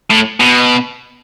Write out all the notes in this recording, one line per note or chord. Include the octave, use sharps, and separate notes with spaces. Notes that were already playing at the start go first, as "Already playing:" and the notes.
A2
B2